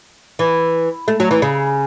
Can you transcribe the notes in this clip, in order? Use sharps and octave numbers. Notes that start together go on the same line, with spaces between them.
E3
A3
F#3
E3
C#3